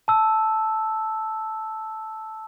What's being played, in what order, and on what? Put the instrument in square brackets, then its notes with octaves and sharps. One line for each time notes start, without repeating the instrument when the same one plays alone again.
[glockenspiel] A5 E6